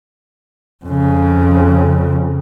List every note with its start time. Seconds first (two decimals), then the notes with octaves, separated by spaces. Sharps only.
0.85 F2 C#3